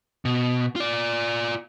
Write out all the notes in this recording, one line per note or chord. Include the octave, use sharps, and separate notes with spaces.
B2
F4 D5